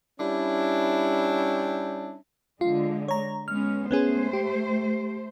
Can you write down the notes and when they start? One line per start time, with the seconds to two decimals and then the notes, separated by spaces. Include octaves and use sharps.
0.20 G3 C#4 D4 E4
2.61 D3 G#3 F4
3.08 C#5 A#5
3.48 G#3 B3 C#4 F6
3.91 A3 B3 C#4 G#4 C5
4.33 G4